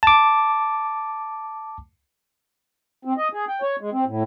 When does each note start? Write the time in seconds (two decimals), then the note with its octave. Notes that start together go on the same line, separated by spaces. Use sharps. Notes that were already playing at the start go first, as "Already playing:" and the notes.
0.03 A5 D6
3.05 C4
3.17 D#5
3.33 G#4
3.49 G5
3.62 C#5
3.81 G#3
3.92 C4
4.07 A2